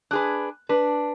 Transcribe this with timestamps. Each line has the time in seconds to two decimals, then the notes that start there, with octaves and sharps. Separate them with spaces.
0.11 D4 G#4 B4 F#6
0.69 D4 B4